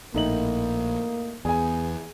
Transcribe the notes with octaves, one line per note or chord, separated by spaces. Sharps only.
A#1 A2 A#3 D#4 F#7
E2 B3 G#4 G#5